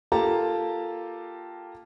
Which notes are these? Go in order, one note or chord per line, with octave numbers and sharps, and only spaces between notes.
A#3 F4 G4 A4 A5 A#5